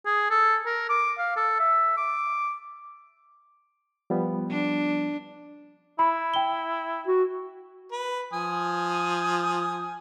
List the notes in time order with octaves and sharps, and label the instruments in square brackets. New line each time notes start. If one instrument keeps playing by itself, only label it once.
[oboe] G#4
A4
A#4
D6
F5
A4
E5
D6
[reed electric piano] F3 G3 B3
[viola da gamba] D4
[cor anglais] E4 [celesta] B5
[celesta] G5 G7
[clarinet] F#4
[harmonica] B4
F3 G#5 D#6